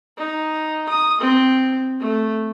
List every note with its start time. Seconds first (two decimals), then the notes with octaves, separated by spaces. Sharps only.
0.18 D#4
0.89 D#6
1.21 C4
2.00 A3